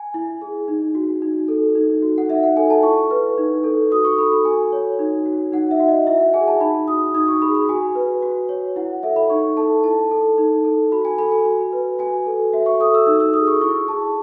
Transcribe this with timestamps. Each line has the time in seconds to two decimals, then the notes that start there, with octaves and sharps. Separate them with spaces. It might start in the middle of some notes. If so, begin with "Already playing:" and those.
Already playing: G#5
0.14 E4
0.42 G#4
0.68 D#4
0.95 F#4
1.22 D#4
1.48 A4
1.75 D#4
2.02 F#4
2.18 F#5
2.29 D#4 E5
2.43 F#5
2.57 A4 G#5
2.70 A5
2.83 E4 C#6
3.11 B4
3.38 D#4
3.64 A4
3.91 F#4 D#6
4.04 C#6
4.18 A4 B5
4.32 B5
4.45 F#4 G#5
4.72 C#5
4.99 D#4
5.26 F#4
5.52 D#4 F#5
5.71 E5
5.80 F#4
5.88 D#5
6.07 E4 E5
6.20 F#5
6.34 G#4 G#5
6.48 A5
6.60 D#4 B5
6.88 F#4 D#6
7.14 D#4 D#6
7.28 C#6
7.42 G#4 B5
7.55 B5
7.69 F#4 G#5
7.95 B4
8.22 F#4
8.49 C#5
8.76 E4 F#5
9.03 A4 E5
9.16 B5
9.30 D#4 C#6
9.57 A4 A5
9.84 E4 A5
10.11 A4
10.38 D#4
10.65 A4
10.92 F#4 B5
11.05 G#5
11.18 A4 B5
11.32 G#5
11.45 F#4
11.73 B4
11.99 F#4 G#5
12.26 A4
12.53 F#4 E5
12.66 C#6
12.80 A4 D#6
12.94 E6
13.06 D#4 E6
13.20 E6
13.34 G#4 D#6
13.48 C#6
13.61 E4 C#6
13.88 G#4 A5